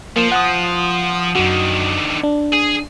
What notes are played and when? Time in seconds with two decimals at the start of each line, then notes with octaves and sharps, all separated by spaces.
0.16 F3 A#3
0.32 F#5 D#6
1.35 F#2 D3 D#3 F#4
2.23 D4
2.52 G#4